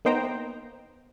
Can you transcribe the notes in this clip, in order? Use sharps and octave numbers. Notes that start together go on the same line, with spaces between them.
A#3 B3 D#4 C5 G5 A#5